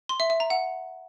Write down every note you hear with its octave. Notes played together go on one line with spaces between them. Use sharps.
C6
E5
E5
A#5
F#5